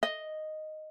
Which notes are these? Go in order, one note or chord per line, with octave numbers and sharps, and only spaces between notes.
D#5